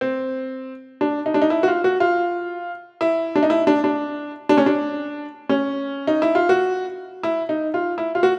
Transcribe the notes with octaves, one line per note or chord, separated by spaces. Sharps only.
C4
D4
D#4
D4
D#4
E4
F#4
F4
F#4
F4
E4
D4
D#4
E4
D4
D4
D4
C#4
D4
C#4
D#4
E4
F4
F#4
E4
D#4
F4
E4
F4
F#4